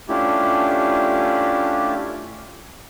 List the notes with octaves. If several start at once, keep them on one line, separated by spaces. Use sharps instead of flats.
A3 C#4 D4 E4 F4 G4